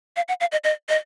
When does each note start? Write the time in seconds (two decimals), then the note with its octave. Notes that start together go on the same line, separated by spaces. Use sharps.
0.16 F5
0.28 F#5
0.41 F5
0.52 D#5
0.64 D#5
0.89 D#5